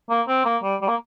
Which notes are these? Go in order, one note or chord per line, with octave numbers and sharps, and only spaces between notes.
A#3
C4
A#3
G3
G3
A#3